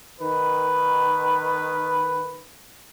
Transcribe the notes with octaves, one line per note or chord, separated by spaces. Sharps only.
D#3 B4